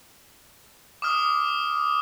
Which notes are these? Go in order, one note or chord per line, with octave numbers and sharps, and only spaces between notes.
D6 D#6 F6